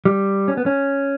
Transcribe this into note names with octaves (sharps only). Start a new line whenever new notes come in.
G3
C#4
B3
C#4